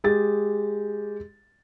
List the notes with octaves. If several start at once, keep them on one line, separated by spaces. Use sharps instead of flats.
G#3 G4 A6